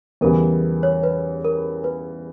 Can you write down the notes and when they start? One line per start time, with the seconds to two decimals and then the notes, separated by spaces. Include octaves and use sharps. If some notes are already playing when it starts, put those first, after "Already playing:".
0.21 E2 C#3 E3 G3 A#4
0.83 C#5
1.03 B4
1.45 A#4
1.84 B4